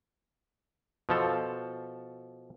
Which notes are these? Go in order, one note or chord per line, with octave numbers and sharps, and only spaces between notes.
B2 F3 A4